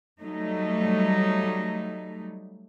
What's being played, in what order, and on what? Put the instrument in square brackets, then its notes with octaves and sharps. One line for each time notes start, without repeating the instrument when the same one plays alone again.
[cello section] F#3 G3 A3 D#4